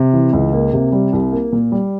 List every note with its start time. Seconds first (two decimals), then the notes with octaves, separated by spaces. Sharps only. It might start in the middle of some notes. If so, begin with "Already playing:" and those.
Already playing: C3
0.13 E3
0.33 C#2
0.53 A#3
0.73 C3
0.92 G3
1.13 C2
1.32 A#3
1.52 A#2
1.72 G3